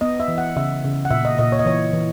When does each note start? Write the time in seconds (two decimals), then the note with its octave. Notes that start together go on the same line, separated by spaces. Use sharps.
0.01 B3 D#5
0.20 E5
0.28 E3
0.38 F#5
0.56 C#3 E5
0.84 C#3
1.05 F#5
1.10 A#2 E5
1.25 D#5
1.38 A#2 D#5
1.52 C#5
1.59 D#5
1.65 E3 C#5
1.93 E3